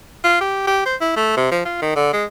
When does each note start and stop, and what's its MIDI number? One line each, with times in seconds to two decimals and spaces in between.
0.24 0.40 65
0.41 0.66 67
0.67 0.81 67
0.86 0.96 72
1.01 1.13 64
1.16 1.36 57
1.37 1.50 48
1.52 1.62 53
1.65 1.77 65
1.82 1.95 51
1.96 2.12 50
2.13 2.24 56